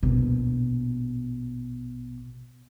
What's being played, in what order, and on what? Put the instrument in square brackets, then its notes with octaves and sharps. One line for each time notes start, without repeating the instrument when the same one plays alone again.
[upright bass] A#1 B2